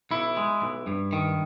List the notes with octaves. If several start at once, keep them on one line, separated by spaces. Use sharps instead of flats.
B1 E4
G#3
B1
G2
D#3